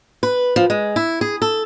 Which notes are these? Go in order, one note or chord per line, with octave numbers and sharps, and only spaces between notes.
B4
F3
G#3
E4
G#4
A4